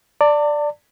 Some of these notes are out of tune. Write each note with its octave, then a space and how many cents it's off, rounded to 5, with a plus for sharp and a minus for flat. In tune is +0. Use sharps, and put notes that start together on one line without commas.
D5 +0 A5 +40